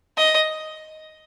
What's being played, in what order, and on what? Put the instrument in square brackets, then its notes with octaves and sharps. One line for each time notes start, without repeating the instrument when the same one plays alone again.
[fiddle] D#5